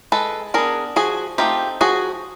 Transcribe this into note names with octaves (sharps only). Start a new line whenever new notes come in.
G#3 A4 B4
B3 D4 G#4 A#4
F3 F#4 G#4
A3 C4 D#4 F4 G4
F3 F#4 G#4